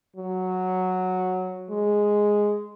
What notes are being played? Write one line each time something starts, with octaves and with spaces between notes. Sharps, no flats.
F#3
G#3